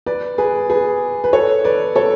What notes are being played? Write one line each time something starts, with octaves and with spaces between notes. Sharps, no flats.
B4 D5
G#4 B4
G#4 B4
B4
A4 C#5
B4 D5
A4 C#5